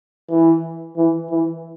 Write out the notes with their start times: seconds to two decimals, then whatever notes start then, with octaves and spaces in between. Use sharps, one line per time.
0.30 E3
0.97 E3
1.30 E3